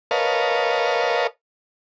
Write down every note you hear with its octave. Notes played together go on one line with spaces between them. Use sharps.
A#4 B4 C#5 D#5 F5 A5